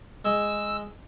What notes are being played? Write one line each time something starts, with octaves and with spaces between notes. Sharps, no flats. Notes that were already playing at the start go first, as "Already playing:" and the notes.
G#3 E6